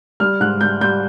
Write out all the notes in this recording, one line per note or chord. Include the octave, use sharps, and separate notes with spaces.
G3 F6
G#2 F#6
G3 G6
G3 G6